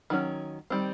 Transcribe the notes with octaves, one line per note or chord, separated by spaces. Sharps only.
D#3 F#3 C#4
D#3 G3 C4